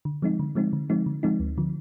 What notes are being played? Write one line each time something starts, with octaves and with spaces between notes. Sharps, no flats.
D3
F3 G#3 C4 D#4
D3
F3 G#3 C4 D#4
D3
F3 G#3 C4 D#4
D3
F3 G#3 C4 D#4
D2
D3 F3